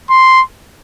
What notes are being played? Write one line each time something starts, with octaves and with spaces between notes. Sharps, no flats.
C6